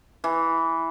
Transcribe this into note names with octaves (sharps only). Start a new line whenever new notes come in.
E3